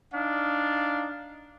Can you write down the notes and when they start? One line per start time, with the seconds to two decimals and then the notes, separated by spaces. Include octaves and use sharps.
0.13 D4 D#4 F5